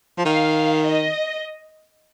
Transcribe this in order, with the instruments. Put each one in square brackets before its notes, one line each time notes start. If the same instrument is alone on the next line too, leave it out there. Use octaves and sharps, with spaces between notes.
[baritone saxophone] F3
[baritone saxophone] D#3 [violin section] F5
[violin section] D#5